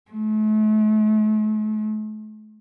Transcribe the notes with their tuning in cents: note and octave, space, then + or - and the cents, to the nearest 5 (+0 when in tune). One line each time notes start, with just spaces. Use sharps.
A3 -40